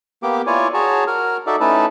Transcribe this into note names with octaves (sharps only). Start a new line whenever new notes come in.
A#3 B3 G4 D6
E4 F4 C#5 D5 G#5
F#4 G#4 C#5 A5 A#5
F#4 A#4 F6
D#4 F#4 A4 D5 E5
A3 C#4 D#4 E4 B4 A5